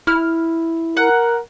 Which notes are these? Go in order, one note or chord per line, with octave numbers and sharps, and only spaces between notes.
E4 F6
A#4 F#5